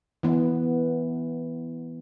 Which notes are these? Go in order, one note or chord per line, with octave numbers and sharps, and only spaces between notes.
E3 B3